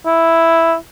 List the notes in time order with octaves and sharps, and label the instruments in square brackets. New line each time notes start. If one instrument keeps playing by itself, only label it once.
[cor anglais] E4